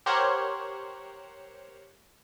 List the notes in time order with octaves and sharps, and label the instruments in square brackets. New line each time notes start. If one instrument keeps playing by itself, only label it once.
[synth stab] G4 A#4 C5 C#5 F#5